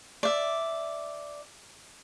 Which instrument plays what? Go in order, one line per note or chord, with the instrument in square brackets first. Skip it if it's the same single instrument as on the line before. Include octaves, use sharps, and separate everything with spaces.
[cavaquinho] D5 E5